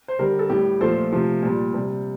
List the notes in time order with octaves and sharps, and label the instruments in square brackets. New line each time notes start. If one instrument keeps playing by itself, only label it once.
[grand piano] C5
D3 G3 G4 A#4
A4
A2 G3 G4
A#2 F3 A3 A4 C5
C3 F3 A3
A#2 G3
C3 G3